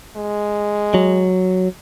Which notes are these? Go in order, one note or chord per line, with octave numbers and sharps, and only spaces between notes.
G#3
F#3